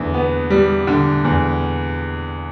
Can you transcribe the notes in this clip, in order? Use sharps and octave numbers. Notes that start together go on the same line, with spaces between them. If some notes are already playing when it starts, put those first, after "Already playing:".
Already playing: E2 D3
B3
G3
D3
E2